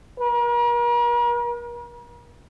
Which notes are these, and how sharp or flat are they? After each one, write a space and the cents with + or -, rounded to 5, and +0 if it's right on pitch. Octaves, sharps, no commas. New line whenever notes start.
A#4 +45